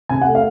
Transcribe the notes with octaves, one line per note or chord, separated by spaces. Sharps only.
C3 G#5
A3 F#5
F5